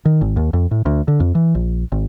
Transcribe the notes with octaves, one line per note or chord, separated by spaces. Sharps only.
D#3
G#1
D#2
F2
A2
D2
D3
F2
E3
A#1
G#1